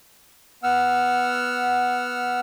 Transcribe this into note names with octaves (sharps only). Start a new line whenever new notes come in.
B3 F#5 E6 F6